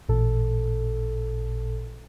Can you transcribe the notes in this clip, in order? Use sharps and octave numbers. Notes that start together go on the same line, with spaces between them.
A1 A#2 A4